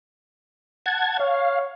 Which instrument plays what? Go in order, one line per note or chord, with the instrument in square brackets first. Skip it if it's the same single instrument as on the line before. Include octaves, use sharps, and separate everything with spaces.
[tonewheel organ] F#5 A5 G#6
[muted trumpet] C#5 [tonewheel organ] F5